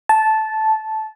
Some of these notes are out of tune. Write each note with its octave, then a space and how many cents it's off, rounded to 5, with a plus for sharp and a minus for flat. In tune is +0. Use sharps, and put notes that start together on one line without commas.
A5 -10